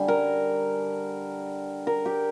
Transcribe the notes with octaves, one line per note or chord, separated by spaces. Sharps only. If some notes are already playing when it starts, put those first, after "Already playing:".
Already playing: D3 G3 G#5
A#4
A#4
G4